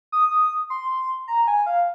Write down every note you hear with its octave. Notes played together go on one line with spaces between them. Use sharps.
D#6
C6
A#5
G#5
F5